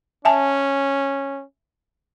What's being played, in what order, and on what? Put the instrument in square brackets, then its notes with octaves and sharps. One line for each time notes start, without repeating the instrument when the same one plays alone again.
[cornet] C#4 [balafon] E5 G#5 A5